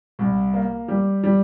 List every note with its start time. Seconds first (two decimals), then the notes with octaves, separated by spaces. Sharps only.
0.19 C2
0.54 A#3
0.88 G3
1.24 G3